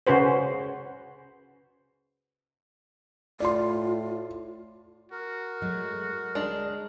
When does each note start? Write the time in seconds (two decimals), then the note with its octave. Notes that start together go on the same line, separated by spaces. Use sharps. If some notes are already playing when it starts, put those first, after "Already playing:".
0.07 C#3 C#4 F#4 B4 C5
3.40 A2 F4 D5 C6
5.12 F#4 A#4
5.62 F#3 G#3 A3
6.35 D2 G#3 D4 G#4